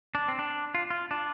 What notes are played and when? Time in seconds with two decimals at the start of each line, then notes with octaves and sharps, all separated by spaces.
0.15 D4
0.28 C4
0.39 D4
0.74 F4
0.90 F4
1.11 D4